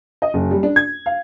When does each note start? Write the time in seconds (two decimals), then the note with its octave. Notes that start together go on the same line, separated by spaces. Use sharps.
0.22 D#5
0.34 F#1
0.51 G3
0.63 D4
0.76 G#6
1.06 F5